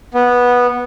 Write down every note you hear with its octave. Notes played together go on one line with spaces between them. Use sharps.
B3